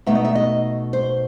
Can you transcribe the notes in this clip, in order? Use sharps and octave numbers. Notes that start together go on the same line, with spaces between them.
B2 A3 D#4 E5
D#5
E5
D#5
C5